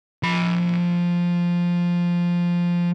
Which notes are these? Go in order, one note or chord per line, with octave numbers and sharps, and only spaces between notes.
F3 B5